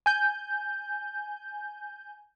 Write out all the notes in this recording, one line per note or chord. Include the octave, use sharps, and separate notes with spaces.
G#5 G6